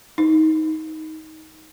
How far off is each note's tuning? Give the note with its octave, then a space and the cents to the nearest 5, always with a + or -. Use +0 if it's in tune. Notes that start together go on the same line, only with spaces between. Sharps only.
D#4 +20